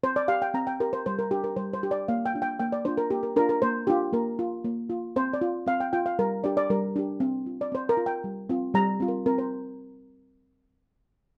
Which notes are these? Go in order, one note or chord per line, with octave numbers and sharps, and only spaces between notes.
C4 C5
D5
G4 F5
G5
C4 A#5
G5
G4 A#4
C5
G3 C5
A#4
D4 G4
A#4
G3 C5
C5
D4 G4
D5
A#3 F5
G5
D4 F4
G5
A#3 G5
D5
D4 F4 C5
A#4
A#3 G4
A#4
D4 F4 A#4
A#4
A#3 C5
D4 F4 G4
A#3 A#4
F4
A#3
F4
C4 C5
D5
F4
C4 F5
G5
F4 G5
F5
G3 A#4
D4 G4 D5
D5
G3 A#4
D4 G4
C4
F4
D5
C4 C5
A#4
F4
G5
G3
C4 F4
G3 A#5
C4 F4
A#4
C4 A#4
C5